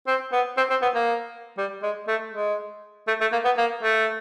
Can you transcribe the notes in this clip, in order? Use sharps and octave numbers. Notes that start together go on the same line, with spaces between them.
C4
B3
C4
C4
B3
A#3
G3
G#3
A3
G#3
A3
A3
A#3
B3
A#3
A3